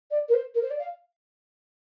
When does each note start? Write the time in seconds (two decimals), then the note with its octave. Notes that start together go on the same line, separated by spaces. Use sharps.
0.11 D5
0.28 A#4
0.34 C5
0.54 A#4
0.62 C5
0.70 D5
0.79 F5